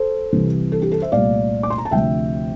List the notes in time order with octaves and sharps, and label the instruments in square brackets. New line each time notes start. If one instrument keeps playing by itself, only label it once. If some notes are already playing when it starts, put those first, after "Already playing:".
Already playing: [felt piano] A4 C5
C2 C3 E3 G3
A4
G4
A4
C5 E5
C2 A#2 A3 D5 F5
D6
C6
A#5
A5
D2 C3 F3 A3 E5 G5